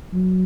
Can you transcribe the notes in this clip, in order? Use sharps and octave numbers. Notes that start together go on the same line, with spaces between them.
F#3